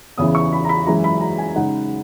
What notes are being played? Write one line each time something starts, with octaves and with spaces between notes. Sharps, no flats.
E2 C#3 E3 D#6
C#6
B5
A#5
B5
F#2 E3 G#3 A#5
B5
A#5
G#5
C#3 G#3 D#4 F#5